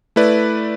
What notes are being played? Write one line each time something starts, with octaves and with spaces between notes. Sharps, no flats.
A3 E4 B4 D5